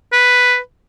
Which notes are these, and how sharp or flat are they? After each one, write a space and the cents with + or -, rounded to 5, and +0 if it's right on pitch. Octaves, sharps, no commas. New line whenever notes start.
B4 +0